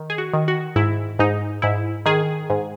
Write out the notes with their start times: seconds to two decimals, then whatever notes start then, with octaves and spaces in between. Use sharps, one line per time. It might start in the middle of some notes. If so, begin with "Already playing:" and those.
Already playing: D#3
0.10 G#4
0.18 F#4
0.33 D#3
0.48 F#4
0.76 G#2 E4
1.19 G#2 D#4
1.62 G#2 E4
2.06 D#3 G#4
2.50 G#2